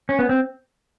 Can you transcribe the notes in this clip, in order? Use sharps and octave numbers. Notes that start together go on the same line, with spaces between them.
C#4
B3
C4